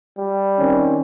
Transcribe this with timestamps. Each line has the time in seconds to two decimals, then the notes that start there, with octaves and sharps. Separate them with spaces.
0.18 G3
0.58 D#3 C4 C#4